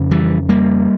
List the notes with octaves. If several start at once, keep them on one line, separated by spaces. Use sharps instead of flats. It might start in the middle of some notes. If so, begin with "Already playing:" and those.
Already playing: F2 C#3
E3 G3
G3 A#3